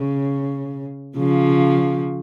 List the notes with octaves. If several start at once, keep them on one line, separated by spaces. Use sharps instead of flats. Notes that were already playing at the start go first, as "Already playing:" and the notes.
Already playing: C#3
C#3 F3